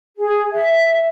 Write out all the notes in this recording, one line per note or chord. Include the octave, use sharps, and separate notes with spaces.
G#4
E5